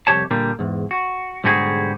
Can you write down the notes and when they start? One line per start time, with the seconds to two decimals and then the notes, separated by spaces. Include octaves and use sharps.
0.07 C2 F2 B2 G4 C#5 A5
0.31 A#2 D3 G3 A#3
0.59 E2 G#2
0.91 F#4
1.44 B1 G#2 D3 G3 F#4 G#4